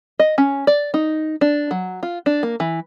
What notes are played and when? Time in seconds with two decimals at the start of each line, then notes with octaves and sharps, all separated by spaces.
0.19 D#5
0.38 C#4
0.67 D5
0.94 D#4
1.41 D4
1.71 F#3
2.03 F4
2.26 D4
2.43 A#3
2.60 E3